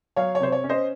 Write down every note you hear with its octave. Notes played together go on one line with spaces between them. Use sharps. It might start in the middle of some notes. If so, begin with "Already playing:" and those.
F#3 C#5 F5
C#5
C3 C5
C#5
C#4
C5 D#5